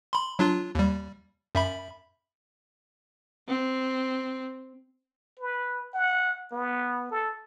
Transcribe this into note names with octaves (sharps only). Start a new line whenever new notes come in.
B5 C6
F#3 D4 F4
D#2 G3
F#2 E5 B5
C4
B4
F#5
B3
A4